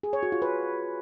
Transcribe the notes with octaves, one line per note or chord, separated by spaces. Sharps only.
G#4
C#5
F#4
F4
B4